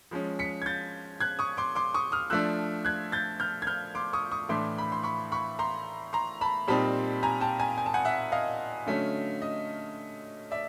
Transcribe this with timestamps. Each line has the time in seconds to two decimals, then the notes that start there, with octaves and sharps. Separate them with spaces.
0.11 F3 G#3 C#4
0.39 B6 C#7
0.62 G#6
0.66 G6 A6
1.21 F#6 G#6
1.39 C#6 D#6
1.57 C6 D6
1.75 C6 D6
1.94 C#6 D#6
2.12 D#6 F6
2.30 F3 A3 D4 E6 F#6
2.85 F#6 G#6
3.12 G6 A6
3.40 F6 G6
3.62 G#6
3.67 F6 G6
3.95 C6 D6
4.13 C#6 D#6
4.31 C#6 D#6
4.49 A2 E3 A3 D4 C6 D6
4.78 B5
4.92 C6
5.03 B5 C#6
5.32 B5 C#6
5.59 A#5 C6
6.13 A#5 C6
6.41 A5 B5
6.68 A#2 G3 C4 D#4 A5 B5
7.23 G#5 A#5
7.41 G5 A5
7.59 G#5 A#5
7.78 G#5
7.86 A5
7.94 F#5 G#5
8.05 E5 F#5
8.32 D#5 F5
8.86 D3 F#3 A3 C#4
9.42 D#5
10.51 D5 E5